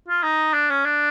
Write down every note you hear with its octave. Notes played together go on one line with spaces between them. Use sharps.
F4
D#4
D4
C#4
D4